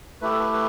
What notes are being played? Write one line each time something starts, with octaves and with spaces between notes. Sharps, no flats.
A3 E4 G4 B4
A4
B4
B4